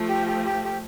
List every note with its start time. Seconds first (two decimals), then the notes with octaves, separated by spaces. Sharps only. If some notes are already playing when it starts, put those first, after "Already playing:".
Already playing: F3 A3
0.09 G4
0.27 G4
0.45 G4
0.64 G4